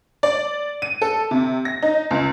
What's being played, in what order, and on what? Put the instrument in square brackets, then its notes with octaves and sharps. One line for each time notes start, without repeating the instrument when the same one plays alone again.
[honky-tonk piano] D5
D#7
A4
C3
A#6
D#4
C#2